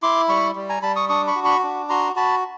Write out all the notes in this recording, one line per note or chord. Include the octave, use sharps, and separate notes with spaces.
E4 C6 D6
G3 B5 C#6
G3
G#5 A#5
G3 A5 B5
C#6 D#6
D4 C#6 D#6
B5 C#6
F#4
B5 C#6
D4
F#4 A#5 C6
F#4 A5 B5